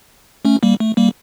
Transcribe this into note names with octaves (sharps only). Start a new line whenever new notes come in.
A3 C#4
G3 A#3
A3
G3 A#3